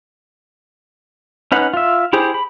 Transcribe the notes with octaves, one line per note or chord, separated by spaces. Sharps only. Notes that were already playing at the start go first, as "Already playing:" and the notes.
C#4 D#4 B4 F#5
F4 E5
E4 G4 G#4 C5
B5